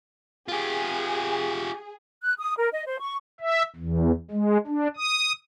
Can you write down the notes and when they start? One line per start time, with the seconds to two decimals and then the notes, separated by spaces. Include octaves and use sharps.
0.48 F4 G4 G#4
2.23 F#6
2.38 D#6
2.57 A#4
2.73 D#5
2.87 C5
3.00 C#6
3.40 E5
3.76 E2
4.31 G#3
4.67 D4
4.96 D#6